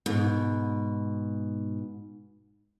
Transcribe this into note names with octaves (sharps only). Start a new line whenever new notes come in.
G#2 B2